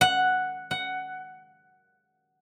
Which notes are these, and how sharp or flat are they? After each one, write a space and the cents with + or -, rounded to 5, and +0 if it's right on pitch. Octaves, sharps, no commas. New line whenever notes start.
F#5 +0
F#5 +10